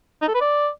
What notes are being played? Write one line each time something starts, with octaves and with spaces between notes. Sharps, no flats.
D#4
A4
B4
D5